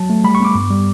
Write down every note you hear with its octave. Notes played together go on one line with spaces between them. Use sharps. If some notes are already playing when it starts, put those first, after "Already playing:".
Already playing: F#3 A5
A3
G3 B5
C#6
B3 D6
G2
G3